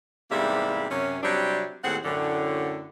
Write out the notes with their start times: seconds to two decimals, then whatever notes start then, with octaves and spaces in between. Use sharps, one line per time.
0.31 E2 G#2 C3 G3 A#3 E4
0.91 F#2 C3 C#4
1.23 C3 F#3 G3 C4 D4
1.83 D#2 A2 C4 G#4 F#5
2.05 F#2 A2 D3